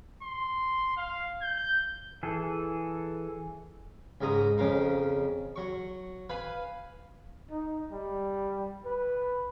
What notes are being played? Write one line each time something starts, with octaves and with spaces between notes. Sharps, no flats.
C6
F5
G6
E3 G#4 A4
C#2 G#2 G#3 A#5 D#6
F2 C#3 A#4 F5
F#3 C#6
B4 F5 G#5 B5
D#4
G3
B4